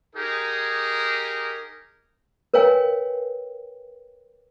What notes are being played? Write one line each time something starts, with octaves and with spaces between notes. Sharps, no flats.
D#4 G4 G#4 A#4
A#4 B4 C#5 F5 G5 G#5